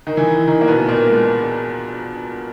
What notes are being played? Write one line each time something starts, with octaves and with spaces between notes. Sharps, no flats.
D#3 D#4
E3 E4
E4
D#3 D#4
A#3
B2 B3
A#2 A#3
G#3